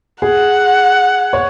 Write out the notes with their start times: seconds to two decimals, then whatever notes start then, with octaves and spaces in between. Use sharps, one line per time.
0.22 G#4 F#5
1.33 C#5